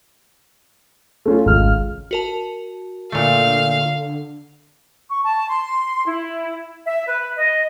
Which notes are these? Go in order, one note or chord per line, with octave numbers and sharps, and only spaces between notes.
A3 C#4 F4
G#1 C#2 F6
F#4 A#4 A5
A#2 D3 A3 F5
C#6
A5
C6
E4
E5
B4
D#5